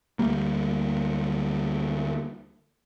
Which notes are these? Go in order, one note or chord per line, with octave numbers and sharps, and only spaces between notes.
D2 G3 A#3